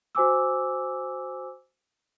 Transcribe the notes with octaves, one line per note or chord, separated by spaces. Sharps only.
F#4 C5 G#5 D6 E6